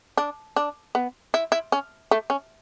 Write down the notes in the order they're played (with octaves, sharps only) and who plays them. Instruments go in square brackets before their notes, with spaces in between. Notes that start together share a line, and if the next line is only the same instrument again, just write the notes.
[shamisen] D4
D4
B3
E4
E4
C#4
A3
C#4